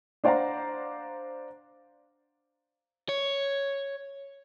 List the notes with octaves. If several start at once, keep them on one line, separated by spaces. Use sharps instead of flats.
D4 C5 D5 F5 F#5 A#5
C#5